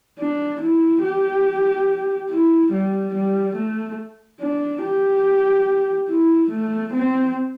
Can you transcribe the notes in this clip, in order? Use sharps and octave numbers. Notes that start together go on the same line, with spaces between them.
D4
E4
G4
E4
G3
G3
A3
D4
G4
E4
A3
C4